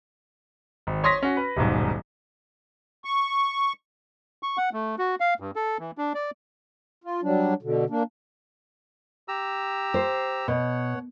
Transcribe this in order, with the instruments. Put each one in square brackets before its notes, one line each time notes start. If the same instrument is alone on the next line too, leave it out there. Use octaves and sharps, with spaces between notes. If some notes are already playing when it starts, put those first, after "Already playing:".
[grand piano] G#1
C#5 C6 D#6 A#6 B6
C#4 F#4
B4
D#1 B1 G#2
[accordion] C#6
[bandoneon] C#6
F#5
A3
F#4
F5
G2
A4
E3
D4
D5
[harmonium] F4
F#3 G3 D4
B2 D3
A#3 D4
[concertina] G4 A#5 E6
[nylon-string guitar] C5
[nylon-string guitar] B2 [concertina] C#5 F#5